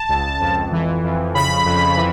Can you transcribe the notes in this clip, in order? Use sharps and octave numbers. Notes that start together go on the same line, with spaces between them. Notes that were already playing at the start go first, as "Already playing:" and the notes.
Already playing: A5
C#2
F2
E3
F2
C#3 B5
F2
E3